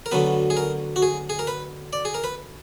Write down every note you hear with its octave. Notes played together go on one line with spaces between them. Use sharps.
A#4
D2 D3 F#3 B3 B4
G#4
A#4
F#4
G#4
G#4
A#4
B4
D5
G#4
A#4
B4